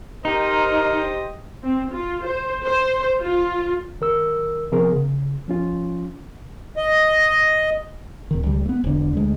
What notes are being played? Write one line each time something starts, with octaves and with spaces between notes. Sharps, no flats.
D#4 G4 A#4 C5 D#5
C4
F4
C5
C5
F4
D#3 A#4 E6
C3 F3 B3 G#4 A#4
C#3
F3 C#4 F4
D#5
D1 D#3
C#2 G3
A3 B3
E1 D3
D2 G#3